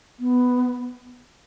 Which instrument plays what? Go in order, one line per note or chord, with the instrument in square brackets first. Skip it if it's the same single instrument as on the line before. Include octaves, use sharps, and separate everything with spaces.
[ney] B3